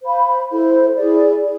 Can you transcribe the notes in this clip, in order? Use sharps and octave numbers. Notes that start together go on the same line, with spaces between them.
C5 F5 B5
E4 A4 C5
E4 G#4 D5
G#4